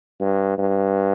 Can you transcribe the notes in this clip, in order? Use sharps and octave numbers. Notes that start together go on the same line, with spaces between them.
G2
G2